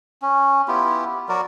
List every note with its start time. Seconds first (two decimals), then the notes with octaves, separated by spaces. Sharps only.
0.22 C#4
0.68 B3 E4 F4 G4
1.29 F#3 F#4 A#4 D5